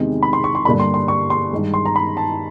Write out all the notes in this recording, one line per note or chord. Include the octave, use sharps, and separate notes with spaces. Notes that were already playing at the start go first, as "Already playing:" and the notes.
Already playing: E2 C3 D#3 G#3 C4
B5
C6
C#6
C6
G2 D3 G3 A#3 D4 B5
C6
C6
C#6
C6
G2 D#3 G#3
C6
A#5
B5
A5